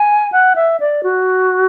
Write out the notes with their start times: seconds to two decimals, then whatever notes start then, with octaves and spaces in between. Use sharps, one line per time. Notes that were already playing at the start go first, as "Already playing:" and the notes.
Already playing: G#5
0.32 F#5
0.56 E5
0.80 D5
1.03 F#4